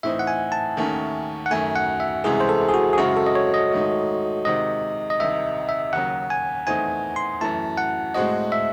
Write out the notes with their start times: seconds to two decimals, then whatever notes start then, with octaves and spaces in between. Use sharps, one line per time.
0.03 A2 E3 C4 D#4 E5
0.19 F#5
0.27 G#5
0.52 A5
0.77 D#2 D#3 A3 C#4
1.46 F#5
1.51 F#2 D#3 A3 G#5
1.76 F#5
2.00 E5
2.24 C2 C3 E3 G#3 C#4 G#4
2.40 C5
2.49 A4
2.69 G#4
2.74 F#4
2.93 G#4
2.98 F#2 C#3 G#3 C4 E4 F#4
3.17 A4
3.27 D#5
3.35 C#5
3.54 D#5
3.72 G#2 D#3 A3
4.45 C3 D#3 G#3 C4 F#4 D#5
5.10 D#5
5.20 C2 C3 D#3 E5
5.69 E5
5.93 D#2 C#3 F#3 F#5
6.30 G#5
6.67 E2 D#3 A3 C4 D#4 G#5
7.16 C6
7.41 F#2 E3 A3 A5
7.78 F#5
8.14 A2 G#3 C4 F#4 D#5
8.52 E5